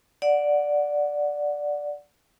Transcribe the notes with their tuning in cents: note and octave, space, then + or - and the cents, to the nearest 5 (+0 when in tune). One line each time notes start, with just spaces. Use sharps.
D5 +0 F#5 -10